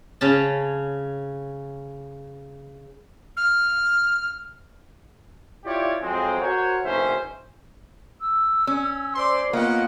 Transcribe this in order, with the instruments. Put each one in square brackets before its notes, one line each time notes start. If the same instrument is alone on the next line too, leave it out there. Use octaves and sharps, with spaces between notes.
[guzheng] C#3 C#4 A5
[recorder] F6
[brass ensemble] E4 F4 G4 C#5 D5
F2 F#3 G#3 C4
F#4 A#4 C5 C#5
F#1 B1 C#4 C5 E5
[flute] E6
[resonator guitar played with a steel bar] C#4
[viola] C5 D5 [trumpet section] C6
[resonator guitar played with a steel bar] A#3 [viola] B3 F4 [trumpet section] C#4 D#5 F#5